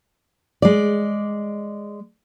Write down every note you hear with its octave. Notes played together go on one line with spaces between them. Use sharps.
G#3 D5